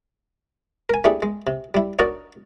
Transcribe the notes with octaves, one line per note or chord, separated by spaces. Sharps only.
A#4 G#5
A3 D4 E4 G4 G#4
G#3
C3
G3 E4
D4 D#4 F#4 A#4 C#5 D5